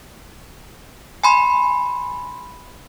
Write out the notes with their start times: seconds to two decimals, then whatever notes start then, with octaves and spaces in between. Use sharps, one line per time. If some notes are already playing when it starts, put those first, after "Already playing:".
1.24 G#5 B5 C6